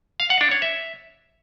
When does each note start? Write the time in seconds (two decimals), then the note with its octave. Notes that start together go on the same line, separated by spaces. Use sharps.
0.20 F5
0.30 F#5
0.41 D4
0.51 C#5
0.62 E5